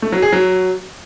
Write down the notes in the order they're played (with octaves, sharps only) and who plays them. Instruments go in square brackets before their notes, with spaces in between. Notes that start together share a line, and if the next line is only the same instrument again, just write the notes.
[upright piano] A3
F#3
G#4
F#3